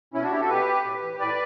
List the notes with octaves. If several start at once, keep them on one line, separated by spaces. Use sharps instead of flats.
B2 C#4 E4
D4 F#4
E4 G4
F#4 A4
B2 G4 B4
A2
E3
A2 B4 D5